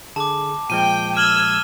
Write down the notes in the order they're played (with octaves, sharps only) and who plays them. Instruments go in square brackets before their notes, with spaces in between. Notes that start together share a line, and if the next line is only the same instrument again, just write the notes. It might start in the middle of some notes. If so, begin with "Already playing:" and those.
[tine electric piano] D3 G#4 [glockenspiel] A5 D6
[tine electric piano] A#2 F3 G#3 [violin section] G5 [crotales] D#7
[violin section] E6 G#6 [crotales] F6 F#7 G7